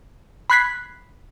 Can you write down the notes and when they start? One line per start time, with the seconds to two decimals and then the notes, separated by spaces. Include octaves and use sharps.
0.50 B5 C6 F#6 G#6 B6 C7